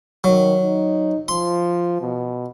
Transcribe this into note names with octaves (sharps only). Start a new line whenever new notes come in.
D#3 F#3
D#4
F3 C6
B2